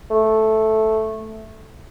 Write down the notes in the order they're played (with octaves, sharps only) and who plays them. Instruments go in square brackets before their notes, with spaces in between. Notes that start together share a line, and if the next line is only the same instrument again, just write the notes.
[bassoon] A3